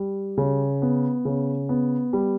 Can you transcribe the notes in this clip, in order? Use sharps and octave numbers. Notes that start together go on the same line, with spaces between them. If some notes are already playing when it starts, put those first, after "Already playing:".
Already playing: G3
C#3
B3
C#3
B3
G3